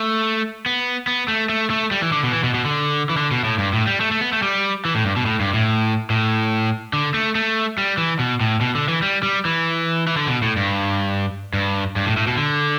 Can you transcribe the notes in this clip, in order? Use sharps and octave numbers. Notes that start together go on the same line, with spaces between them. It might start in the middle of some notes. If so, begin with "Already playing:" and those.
Already playing: A3
B3
B3
A3
A3
A3
G3
E3
D3
B2
E3
B2
B2
D3
E3
D3
B2
A2
G2
A2
G3
A3
A3
B3
A3
G3
E3
A2
G2
B2
A2
G2
A2
A2
D3
A3
A3
G3
E3
B2
A2
B2
D3
E3
G3
G3
E3
E3
D3
B2
A2
G2
G2
G2
A2
A2
B2
D3